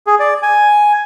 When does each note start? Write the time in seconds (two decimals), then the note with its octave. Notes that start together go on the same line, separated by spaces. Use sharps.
0.07 G#4
0.19 D5
0.43 G#5